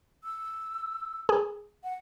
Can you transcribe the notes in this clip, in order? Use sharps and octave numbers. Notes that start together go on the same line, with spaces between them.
E6
G#4
F#5